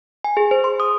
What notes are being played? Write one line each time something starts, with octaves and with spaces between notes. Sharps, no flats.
G#5
G#4
C5
C6
D#6